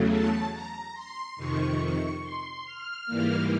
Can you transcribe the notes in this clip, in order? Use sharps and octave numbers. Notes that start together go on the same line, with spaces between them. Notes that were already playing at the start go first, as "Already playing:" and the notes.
Already playing: E2 C#3 F#3 A3
A5
A#5
C6
F2 C3 D#3 C#6
C6
F6
G#2 E3 G3 A#3